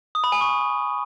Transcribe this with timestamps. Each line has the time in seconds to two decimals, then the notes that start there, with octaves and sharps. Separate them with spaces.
0.15 D#6
0.24 B5
0.32 G#5
0.41 C#6